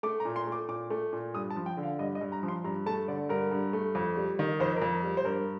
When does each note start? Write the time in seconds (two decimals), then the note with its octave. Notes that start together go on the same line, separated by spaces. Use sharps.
0.03 A3 D6
0.20 A#5
0.25 A#2
0.36 C6
0.47 A3
0.52 D6
0.68 A#2 D6
0.90 A3
1.13 A#2
1.34 G2 D#6
1.50 A5
1.56 F3
1.66 G5
1.77 D3
1.83 F5
1.99 G2 D#5
2.15 D#5
2.21 G2
2.32 A#5
2.43 F3
2.48 C6
2.64 G2 A#5
2.86 A3 A5
3.08 D3 D5
3.29 G2 A#4
3.51 G2
3.73 A3
3.95 F2
4.17 G3
4.39 D#3
4.60 F2 C5
4.76 A#4
4.82 F2
4.93 A#4
5.03 G3
5.17 C5
5.25 G2 A#4